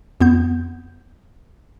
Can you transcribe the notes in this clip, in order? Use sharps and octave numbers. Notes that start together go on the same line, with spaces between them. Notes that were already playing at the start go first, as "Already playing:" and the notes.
F2 B3 G6